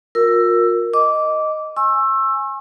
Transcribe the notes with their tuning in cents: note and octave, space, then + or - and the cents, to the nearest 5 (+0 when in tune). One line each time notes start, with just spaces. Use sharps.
F4 +40 A#4 +0 E6 +10
D#5 +0 D6 -15
G#5 +0 C#6 -45 E6 +10